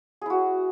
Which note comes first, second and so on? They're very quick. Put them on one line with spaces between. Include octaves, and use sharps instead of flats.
G#4 E4 F#4